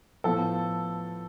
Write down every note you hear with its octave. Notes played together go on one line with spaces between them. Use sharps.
A2 F3 B3 A4